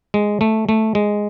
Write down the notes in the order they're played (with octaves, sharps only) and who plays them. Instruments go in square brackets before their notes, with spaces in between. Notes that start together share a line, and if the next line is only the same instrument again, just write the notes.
[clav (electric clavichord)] G#3
A3
A3
G#3